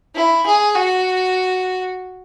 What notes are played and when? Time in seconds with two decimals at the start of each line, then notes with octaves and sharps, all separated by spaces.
0.15 E4
0.46 G#4
0.75 F#4